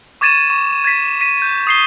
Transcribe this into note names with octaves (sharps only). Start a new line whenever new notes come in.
C#6 D6 G#6 A6 D#7 E7
C#6
G#6 A6 B6 D#7
B6 D#7
G6
D#6 C7 G7